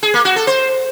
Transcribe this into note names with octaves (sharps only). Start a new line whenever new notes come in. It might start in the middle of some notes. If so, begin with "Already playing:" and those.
G#4
A#3
F#4
A4
C5